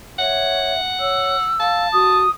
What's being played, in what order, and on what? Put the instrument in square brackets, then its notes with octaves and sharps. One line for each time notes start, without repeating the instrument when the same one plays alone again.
[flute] C#5 [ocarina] E5 [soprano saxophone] F#5
[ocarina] C#5 [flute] E6
[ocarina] F5 [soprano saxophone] A5
[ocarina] F#4 [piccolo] D#6